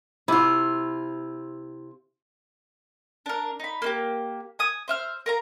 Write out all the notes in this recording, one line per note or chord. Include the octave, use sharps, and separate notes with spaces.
C3 E4 F4
D4 A#4
D#4 B5
A#3 D#4 G4
G#5 D#6
C5 E5 F6
A#4 F5 A#5